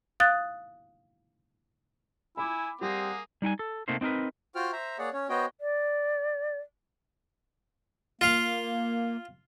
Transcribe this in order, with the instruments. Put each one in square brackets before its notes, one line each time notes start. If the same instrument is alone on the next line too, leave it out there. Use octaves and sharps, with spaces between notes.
[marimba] F5 D#6 F#6 A6
[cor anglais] E4 [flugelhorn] G#5 [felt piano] B5 D6
[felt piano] G3 [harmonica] A#3 G#4 [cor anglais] C4 [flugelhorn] F#5
[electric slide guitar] G3 D#4 G5 G#5
A4
C3 A3 A#3 C4 D#4 C5
C4 D#4 G#4 A#4 B4
[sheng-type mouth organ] F4 F#4 C5 G5 F6
C5 E5 A#5
A#3 G#4 C#5 D5 F#5
C#4 C#5
B3 F#4 C5 C#5 D#5 G5
[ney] D5
[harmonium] A#3 [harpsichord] F4 F5